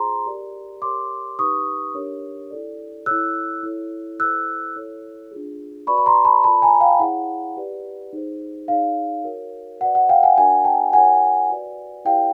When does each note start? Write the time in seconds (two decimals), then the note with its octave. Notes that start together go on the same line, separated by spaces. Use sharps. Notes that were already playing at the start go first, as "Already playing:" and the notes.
Already playing: F4 G#4 C5 A#5 C6
0.26 G4 A#4 D5
0.82 G4 A#4 C#5 C6 D6
1.39 D#4 G4 B4 C#6 D#6
1.94 D4 G4 A#4 C#5
2.51 E4 A4 D5
3.06 E4 A4 C#5 E6 F#6
3.63 E4 A4 C#5
4.19 E4 A4 C5 E6 F#6
4.76 E4 A4 C#5
5.31 D4 F4 G#4
5.87 F#4 B4 D5 B5 C#6
5.98 B5
6.06 A#5 C6
6.25 A5 B5
6.44 F4 A#4 D5 A5 B5
6.62 G#5 A#5
6.81 F5 G5
7.00 E4 G#4 C#5 F#5
7.57 G4 B4 D5
8.13 D#4 G#4 C5
8.68 D#4 G#4 C#5 F5
9.24 F#4 A#4 C#5
9.80 F#4 B4 D5 F#5
9.95 F#5
10.09 F5 G5
10.23 F#5 G#5
10.37 D4 F#4 A#4 D5 F#5 G#5
10.64 G5 A5
10.93 E4 G4 A#4 C#5 F#5 G#5
11.50 F#4 B4 D5
12.05 E4 G4 B4 D5 F5 G5